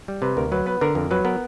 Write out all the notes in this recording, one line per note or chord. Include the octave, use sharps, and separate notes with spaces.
G3
C3 B4
D2 A#4
F#3 B4
B3 B4
D3 A#4
F2 A#4
F#3 B4
B3 A#4